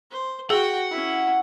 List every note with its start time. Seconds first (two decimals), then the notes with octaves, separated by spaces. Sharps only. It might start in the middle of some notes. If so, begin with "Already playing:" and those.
0.11 C5
0.50 F#4 G#4 F#5 G5
0.91 C#4 E4